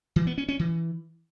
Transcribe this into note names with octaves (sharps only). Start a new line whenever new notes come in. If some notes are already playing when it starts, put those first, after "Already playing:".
E3
B3
C#4
C#4
E3